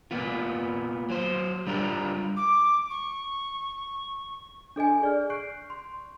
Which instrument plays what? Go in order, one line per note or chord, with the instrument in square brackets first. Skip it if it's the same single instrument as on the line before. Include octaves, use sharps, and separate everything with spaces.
[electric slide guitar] A#3 B3 F4
F#3 C5
G3 D4 F4 A#4
[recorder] D6
C#6
[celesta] D4 A4 D#5 G#5
G#4 D5 F6
C#6 F#6 G6 C7 D7
C6